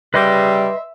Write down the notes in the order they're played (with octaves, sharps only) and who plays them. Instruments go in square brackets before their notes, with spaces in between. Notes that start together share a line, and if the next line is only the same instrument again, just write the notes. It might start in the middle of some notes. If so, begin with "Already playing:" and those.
[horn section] C#3 G3 [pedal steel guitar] B4 D#5 C6 [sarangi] E5